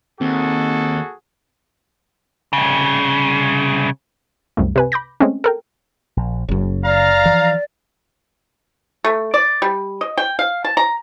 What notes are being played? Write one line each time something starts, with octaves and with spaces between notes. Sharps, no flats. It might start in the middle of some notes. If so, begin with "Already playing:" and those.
D#2 C4 F#4 G#4 A4
C2 C#3
C2 F#2 A3
C3 B4 G#5
B5 D6 G6 A#6
G#3 A3 C4 C#4
A4 A#4 G5
A#1
F#1 F#2 C#3
D5 F5 A#5
E3 F3
A3
D5
G3
D#5
G5
F5
A5
A#5